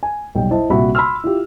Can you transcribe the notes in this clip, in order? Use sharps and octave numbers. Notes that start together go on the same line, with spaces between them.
G#5
B1 G3 G5
E4 C5 D#5 A5
A#1 C3 G3 F#4 E5 B5
B5 C6 E6 F6
E4 F4 G4